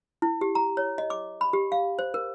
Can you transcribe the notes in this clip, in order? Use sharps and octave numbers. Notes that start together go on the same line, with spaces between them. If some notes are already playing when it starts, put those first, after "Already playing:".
E4
G4
A#5
C#5
D#5
D6
B5
G4
F5
C5
A#4